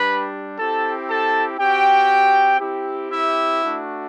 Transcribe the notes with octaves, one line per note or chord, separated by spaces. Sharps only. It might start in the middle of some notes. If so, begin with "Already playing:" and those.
Already playing: G3 D4 G4 B4 B5
C4 E4 G4 A4 A5
A4 A5
C4 F#4 G4 G5
C4 E4 G4
E4 E5
A3 D4 F#4